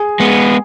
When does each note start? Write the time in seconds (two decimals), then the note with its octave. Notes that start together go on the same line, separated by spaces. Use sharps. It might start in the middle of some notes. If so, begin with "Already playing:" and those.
Already playing: G#4
0.20 G#3 B3